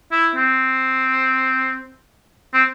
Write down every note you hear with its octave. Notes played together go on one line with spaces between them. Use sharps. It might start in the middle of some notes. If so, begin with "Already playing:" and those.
E4
C4
C4